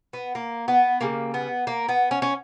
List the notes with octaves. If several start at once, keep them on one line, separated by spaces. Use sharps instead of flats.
B3
A#3
B3
C#3 G3 A#3
B3
A#3
B3
C#4
C#4